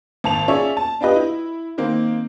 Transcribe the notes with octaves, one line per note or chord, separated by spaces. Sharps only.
G#1 A5 F7
C#4 F4 G#4 C#5 D5 E5
A5
D4 F4 G4 B4 D#5
E4
D#3 A#3 C4